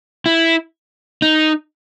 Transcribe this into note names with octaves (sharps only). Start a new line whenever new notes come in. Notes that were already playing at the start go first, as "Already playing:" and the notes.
E4
D#4